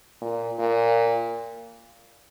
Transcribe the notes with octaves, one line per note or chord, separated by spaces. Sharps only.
A#2
A#2